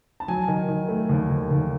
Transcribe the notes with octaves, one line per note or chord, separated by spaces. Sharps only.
A5
F#3 G#5
D#3
D#3
A3
D#2
D#2
D#2